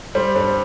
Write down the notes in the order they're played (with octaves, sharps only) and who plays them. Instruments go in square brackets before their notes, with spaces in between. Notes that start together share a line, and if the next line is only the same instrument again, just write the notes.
[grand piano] G3 [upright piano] C5
[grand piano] G2 [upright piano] C5